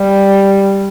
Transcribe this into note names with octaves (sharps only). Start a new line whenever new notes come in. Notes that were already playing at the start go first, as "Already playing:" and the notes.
Already playing: G3